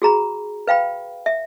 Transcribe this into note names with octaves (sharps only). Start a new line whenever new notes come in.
F#4 G#4 A#5 B5
B4 F5 G5 B5
E5